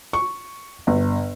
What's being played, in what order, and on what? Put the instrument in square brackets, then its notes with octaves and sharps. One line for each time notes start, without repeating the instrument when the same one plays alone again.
[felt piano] C#6
G1